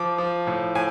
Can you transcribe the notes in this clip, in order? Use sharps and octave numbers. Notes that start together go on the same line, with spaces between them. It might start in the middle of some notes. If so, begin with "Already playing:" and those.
Already playing: F3 D6
F3
A2
A2 G#5